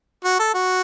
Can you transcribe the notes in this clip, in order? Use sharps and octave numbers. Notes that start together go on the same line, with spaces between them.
F#4
A4
F#4